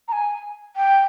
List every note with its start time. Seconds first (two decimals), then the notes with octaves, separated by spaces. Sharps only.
0.08 A#5
0.12 G#5
0.76 G5